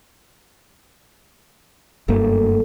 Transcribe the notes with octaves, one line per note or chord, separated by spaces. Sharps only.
F#1 G2 A3 A#3